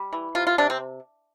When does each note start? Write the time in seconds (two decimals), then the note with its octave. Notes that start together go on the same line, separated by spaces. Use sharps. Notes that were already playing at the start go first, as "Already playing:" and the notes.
Already playing: G3
0.13 E3
0.35 C3 F4
0.47 F4
0.58 C3 D4
0.70 C4